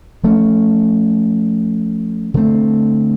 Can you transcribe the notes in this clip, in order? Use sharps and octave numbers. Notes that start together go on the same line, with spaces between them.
F3 A3 C#4
D3 F#3 A3 C4